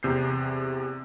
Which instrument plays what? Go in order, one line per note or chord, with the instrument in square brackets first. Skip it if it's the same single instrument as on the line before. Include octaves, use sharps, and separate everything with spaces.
[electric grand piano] E2 C3 G6 C7